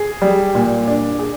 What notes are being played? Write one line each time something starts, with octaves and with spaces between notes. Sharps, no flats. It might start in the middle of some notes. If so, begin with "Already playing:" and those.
Already playing: G#4
G3
A#2
D4
G#4